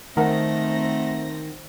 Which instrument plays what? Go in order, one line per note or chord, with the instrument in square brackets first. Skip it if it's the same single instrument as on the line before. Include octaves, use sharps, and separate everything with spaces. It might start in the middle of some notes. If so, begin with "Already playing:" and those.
[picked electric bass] D#3 [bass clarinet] A3 [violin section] C4 A#6 [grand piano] A#4 F#5